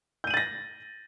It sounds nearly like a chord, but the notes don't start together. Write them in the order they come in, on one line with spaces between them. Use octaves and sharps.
G6 D#7 F#7 A6 A#6